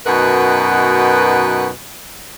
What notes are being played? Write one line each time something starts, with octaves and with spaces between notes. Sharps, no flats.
F#2 B2 D#4 F#4 A#4 B4